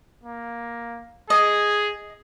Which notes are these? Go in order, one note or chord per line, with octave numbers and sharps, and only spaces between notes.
A#3
G#4 D#5